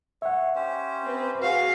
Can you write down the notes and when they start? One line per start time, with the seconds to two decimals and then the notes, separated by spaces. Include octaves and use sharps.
0.22 C#5 E5 F#5
0.55 C#4 G4 C5
1.05 C4 B4
1.42 F#4 G#4 F5